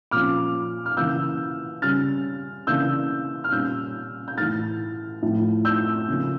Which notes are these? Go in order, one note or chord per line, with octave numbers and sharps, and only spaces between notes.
A#2 F3 C#4 D6 F6
F6
C#3 E3 A#3 E6 G6
C#3 G3 C#4 F6 A6
C#3 E3 A#3 D4 E6 G6
F6
A#2 G3 C#4 E6 G6
G6
A2 E3 A3 F6 A6
A2 F3 A3
E6 G6
C#3 F3 A#3 C#4